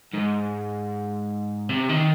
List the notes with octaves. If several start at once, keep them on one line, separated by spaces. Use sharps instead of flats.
G#2
C3
D#3